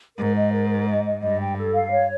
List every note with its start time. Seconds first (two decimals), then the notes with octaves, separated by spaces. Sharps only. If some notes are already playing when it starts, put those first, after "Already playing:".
0.17 G#2 A#4
0.35 D#5
0.52 A#4
0.69 A#4
0.87 D#5
1.05 D#5
1.21 G2 D#5
1.40 G5
1.57 A4
1.74 F5
1.91 C#5